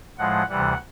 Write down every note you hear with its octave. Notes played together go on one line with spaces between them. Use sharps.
A2 F3 G#3 F#5
D2 C3 E3 G3 F#5